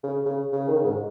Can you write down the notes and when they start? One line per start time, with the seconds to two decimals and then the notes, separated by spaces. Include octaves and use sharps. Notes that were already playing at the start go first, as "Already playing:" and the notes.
0.03 C#3
0.25 C#3
0.52 C#3
0.68 D#3
0.77 C#3
0.85 G#2